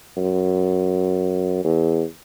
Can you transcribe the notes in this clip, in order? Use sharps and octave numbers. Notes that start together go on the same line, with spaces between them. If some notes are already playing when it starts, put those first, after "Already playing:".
F#2
E2